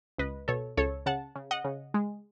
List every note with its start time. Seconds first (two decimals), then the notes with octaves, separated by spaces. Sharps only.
0.18 C#2 B4 D#5
0.48 B2 A4 C#5
0.77 C#2 A4 C#5
1.06 C#3 F#5 A5
1.35 C#3
1.51 D#5 F#5
1.64 C#3
1.94 G#3